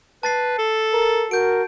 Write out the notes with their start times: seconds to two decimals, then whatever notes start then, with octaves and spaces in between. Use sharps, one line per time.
0.23 B4 A5 A6 C7
0.58 A4
0.93 A#4
1.31 F#4 A#4 G6 D7